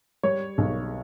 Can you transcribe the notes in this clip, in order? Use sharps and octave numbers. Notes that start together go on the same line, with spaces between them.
G3 C#5
B1